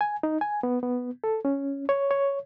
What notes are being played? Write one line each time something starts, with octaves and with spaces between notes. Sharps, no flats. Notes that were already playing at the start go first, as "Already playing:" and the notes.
G#5
D#4
G#5
B3
B3
A4
C#4
C#5
C#5